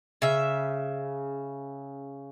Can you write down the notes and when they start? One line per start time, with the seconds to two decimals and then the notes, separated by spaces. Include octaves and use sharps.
0.22 C#3 E5